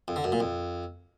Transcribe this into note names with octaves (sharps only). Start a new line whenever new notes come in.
F2
D3
F#2
A#2
F2